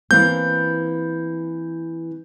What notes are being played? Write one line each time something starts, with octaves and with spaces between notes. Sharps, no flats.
E3 A#3 C4 G6